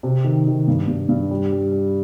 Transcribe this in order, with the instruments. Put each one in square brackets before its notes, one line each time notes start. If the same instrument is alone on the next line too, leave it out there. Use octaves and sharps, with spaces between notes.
[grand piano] C3
D#3
D#3
G2
G2
G2
G3
G3
G3